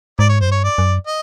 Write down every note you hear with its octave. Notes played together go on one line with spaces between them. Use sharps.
G#2 D5
C#5
F#2 C5
G2 C#5
D5
F#2
D#5